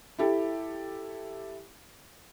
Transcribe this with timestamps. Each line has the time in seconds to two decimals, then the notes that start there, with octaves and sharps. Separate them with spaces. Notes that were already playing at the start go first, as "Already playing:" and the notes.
0.19 E4 G4 A4